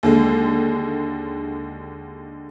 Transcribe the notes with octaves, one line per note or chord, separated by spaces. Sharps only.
D#2 D3 G#3